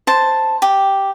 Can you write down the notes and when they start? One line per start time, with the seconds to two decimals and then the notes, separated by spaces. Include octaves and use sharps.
0.07 C5 A5
0.62 G4